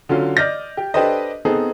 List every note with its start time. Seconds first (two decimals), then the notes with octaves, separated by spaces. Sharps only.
0.09 D3 F#3 C#4 F4
0.37 D5 D#5 F6 G6 A#6
0.77 G4
0.94 D4 G4 A4 B4 C5 D#5
1.45 B3 C4 D#4 G#4 A4